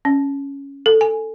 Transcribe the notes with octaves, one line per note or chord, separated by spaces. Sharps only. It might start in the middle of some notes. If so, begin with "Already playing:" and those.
C#4
A4
G#5